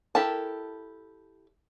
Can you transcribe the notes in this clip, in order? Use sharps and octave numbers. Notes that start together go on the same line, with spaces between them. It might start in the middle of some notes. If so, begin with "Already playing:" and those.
E4 G4 A4 A#4 A5